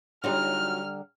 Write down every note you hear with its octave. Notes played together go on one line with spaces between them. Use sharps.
D3 F#3 G3 D#4 F4 A#5 F6